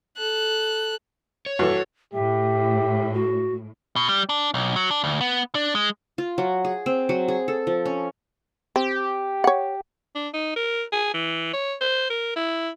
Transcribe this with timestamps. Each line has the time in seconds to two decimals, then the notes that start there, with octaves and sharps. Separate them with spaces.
0.17 A4 F#6
1.46 C#5
1.59 G2 E3 F#4 A4
2.13 A2 G4 E5
3.14 F#4
3.96 B2
4.09 G3
4.29 D4
4.54 B1
4.76 F#3
4.91 D4
5.04 D2
5.21 B3
5.55 D4
5.75 G#3
6.18 F4
6.38 F#3
6.65 G#4
6.86 C4
7.09 F#3
7.28 G#4
7.48 A4
7.67 F3
7.85 C#4
8.76 C4 G4
9.44 C#5 F#5
10.15 D4
10.33 D#4
10.56 A#4
10.93 G#4
11.14 E3
11.53 C#5
11.81 C5
12.10 A#4
12.36 E4